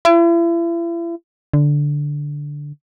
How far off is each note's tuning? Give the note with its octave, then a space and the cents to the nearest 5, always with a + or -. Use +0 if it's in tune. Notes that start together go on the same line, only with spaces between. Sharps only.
E4 +40
D3 -5